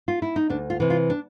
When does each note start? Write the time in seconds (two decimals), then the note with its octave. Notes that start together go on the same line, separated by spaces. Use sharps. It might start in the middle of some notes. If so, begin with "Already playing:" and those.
0.08 F4
0.22 E4
0.36 D#4
0.49 D2 D4
0.70 F4
0.80 C3 E3
0.90 F4
1.10 D4